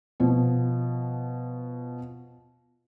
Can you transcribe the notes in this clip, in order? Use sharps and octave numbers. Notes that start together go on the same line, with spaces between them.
B2 F3